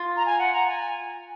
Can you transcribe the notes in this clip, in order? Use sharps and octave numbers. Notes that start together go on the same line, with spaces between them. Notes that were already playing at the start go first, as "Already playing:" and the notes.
Already playing: F4
A#5
G#5
F#5
A#5
G#5